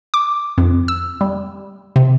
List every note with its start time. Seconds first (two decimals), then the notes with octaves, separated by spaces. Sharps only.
0.14 D6
0.58 F2
0.88 E6
1.21 G3
1.96 C3